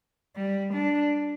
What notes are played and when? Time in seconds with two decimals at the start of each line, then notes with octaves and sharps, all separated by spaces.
0.36 G3
0.74 D4